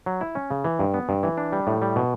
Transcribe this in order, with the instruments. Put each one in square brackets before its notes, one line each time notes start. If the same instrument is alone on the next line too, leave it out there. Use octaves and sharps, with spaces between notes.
[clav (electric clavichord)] F#3
E4
C#4
C#3
E3
G2
B3
G2
E3
D4
G3
A2
G3
B2